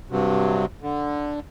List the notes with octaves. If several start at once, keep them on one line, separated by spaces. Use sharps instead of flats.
G2 C3 F#3
D3